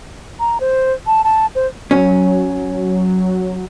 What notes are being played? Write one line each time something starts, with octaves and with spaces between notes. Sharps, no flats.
A#5
C5
A5
A5
C5
F#3 C#4